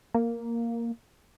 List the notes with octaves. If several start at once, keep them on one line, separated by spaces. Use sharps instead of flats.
A#3